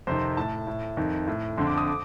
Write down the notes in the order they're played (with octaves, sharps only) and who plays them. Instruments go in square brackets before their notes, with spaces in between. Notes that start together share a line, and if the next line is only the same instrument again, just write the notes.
[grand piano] F2 C3 D#3 C5
A2 A5
A2
F2 D#3
A2
F2 D3 C6
D6
D#6
D6